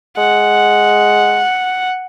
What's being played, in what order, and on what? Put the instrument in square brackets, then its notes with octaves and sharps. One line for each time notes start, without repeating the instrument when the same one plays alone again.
[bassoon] G#3 [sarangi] F#5